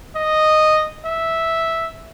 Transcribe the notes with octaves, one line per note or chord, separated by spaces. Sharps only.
D#5
E5